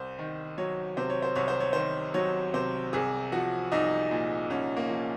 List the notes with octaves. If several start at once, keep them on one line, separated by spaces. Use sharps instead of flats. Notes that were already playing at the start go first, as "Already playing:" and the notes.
Already playing: C2 C5
D#3
F#3 C#5
C3 C5
C#5
C5
C2 C#5
C5
C#5
D#3 C5
F#3 C#5
C3 C5
C2 G#4
F3 F#4
C2 D#4
A#2
C2 C#4
A#3
F3